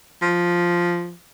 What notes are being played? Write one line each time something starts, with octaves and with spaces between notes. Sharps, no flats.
F3